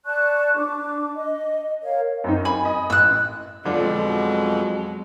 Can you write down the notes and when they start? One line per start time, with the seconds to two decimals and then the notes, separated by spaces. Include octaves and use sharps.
0.05 D5 A5 C#6 F#6
0.57 D4 D6
1.15 D#5
1.82 A#4 C#5 F5
2.24 F#2 C4 D#4
2.45 G#5 B5
2.65 D#5
2.90 A1 E6 F#6
3.65 F2 B2 D3 F3 F#3 G#3 D4